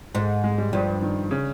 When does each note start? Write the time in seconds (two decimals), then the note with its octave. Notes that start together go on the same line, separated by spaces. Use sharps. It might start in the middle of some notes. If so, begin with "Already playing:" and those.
0.14 G#2 G#3
0.44 G#3
0.58 G3
0.73 G2 F3
1.02 D#3
1.31 C#3